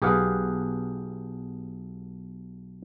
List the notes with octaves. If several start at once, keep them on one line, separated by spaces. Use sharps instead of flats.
B1 G4 G#4 B4 F5 F#5